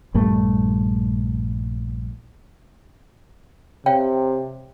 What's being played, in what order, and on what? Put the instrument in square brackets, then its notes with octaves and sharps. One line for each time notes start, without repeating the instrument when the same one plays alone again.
[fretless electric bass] A#1 G2 G3 A3
[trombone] C3 [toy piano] C#5 F5 G5